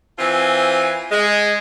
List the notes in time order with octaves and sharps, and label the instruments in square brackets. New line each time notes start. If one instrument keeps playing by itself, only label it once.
[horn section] E3 C4 F4 G#5
G#3